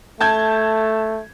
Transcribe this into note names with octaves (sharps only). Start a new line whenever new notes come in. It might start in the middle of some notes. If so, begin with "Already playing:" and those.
A3 A5 G6 G#6